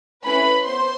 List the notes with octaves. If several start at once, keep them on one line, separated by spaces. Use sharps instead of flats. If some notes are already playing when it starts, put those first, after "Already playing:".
A3 C#4 E4 B4 B5
B3 C5 C6